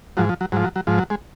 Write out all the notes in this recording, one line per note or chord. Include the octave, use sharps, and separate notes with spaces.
G#2 F3 F#3
F3
F#3
G#2 F3 F#3
F#3
F#3
G#2 F3
F#3
G#3